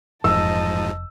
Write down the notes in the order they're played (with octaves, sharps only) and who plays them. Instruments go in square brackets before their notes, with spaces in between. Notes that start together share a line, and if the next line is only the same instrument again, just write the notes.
[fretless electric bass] F1 [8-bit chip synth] G#2 F3 [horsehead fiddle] D#5 A5 [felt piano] E6